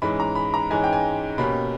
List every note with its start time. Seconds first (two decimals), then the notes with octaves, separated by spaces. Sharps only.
0.02 G#2 E3 G#3 C#4 B5
0.20 A#5
0.35 B5
0.54 A#5
0.70 G#2 E3 G#3 C#4 G#5
0.84 G5
0.93 G#5
1.38 B2 A#3 C#4 G4 B5